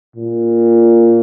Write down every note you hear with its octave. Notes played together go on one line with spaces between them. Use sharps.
A#2